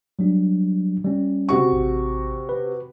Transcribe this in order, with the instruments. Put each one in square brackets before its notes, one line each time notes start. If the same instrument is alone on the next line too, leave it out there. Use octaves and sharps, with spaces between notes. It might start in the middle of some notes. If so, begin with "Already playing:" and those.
[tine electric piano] F#3 G3 D4
G3 C#4
[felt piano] C3 F#4 C#6
[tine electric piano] A1
B4